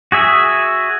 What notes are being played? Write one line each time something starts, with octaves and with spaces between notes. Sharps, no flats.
F#4 G#4 E5